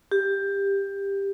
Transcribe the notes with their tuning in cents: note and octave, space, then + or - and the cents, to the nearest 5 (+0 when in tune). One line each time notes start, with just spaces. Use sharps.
G4 +15